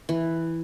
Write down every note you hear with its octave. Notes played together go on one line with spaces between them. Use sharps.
E3